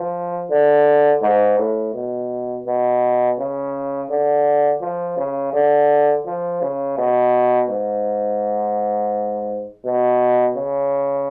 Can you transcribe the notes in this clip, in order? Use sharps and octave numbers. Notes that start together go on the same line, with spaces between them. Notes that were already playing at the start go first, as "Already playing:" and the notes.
Already playing: F3
D3
G#2
A2
B2
B2
C#3
D3
F3
C#3
D3
F3
C#3
B2
G#2
B2
C#3